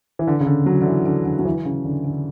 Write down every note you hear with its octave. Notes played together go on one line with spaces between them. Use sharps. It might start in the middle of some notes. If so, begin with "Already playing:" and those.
E3
D3
C#3
D3
F#3
D3
E3
D3
D3
F#3
E3
C#3
D3
D3